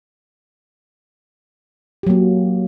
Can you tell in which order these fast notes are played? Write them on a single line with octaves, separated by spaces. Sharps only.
G4 F#3 A#3